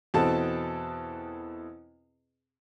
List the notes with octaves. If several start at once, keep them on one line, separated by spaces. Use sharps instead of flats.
E2 B2 C4 A4 A5